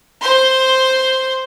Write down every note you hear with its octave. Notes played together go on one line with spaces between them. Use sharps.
C5 C6